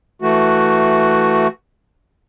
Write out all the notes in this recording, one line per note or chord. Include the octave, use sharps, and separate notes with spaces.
E3 A3 F#4